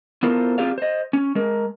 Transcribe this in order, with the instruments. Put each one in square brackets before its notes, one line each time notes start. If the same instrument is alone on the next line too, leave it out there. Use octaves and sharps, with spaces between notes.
[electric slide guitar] B3 E4 F4 A4 A#4 C5
C4 F4 G4 G#4 D5 F5
C5 D#5
C#4
G#3 A#4